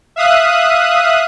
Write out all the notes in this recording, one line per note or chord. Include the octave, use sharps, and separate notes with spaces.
E5 F5 D#6 F#6